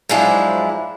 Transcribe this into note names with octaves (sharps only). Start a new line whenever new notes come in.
G#2 F3 F#3 G#3 D4 E4